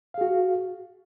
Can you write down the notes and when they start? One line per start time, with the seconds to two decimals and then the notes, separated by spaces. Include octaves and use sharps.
0.14 F5
0.18 G#4
0.21 F#4